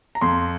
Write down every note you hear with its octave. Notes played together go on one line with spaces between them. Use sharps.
A#5
F2 C6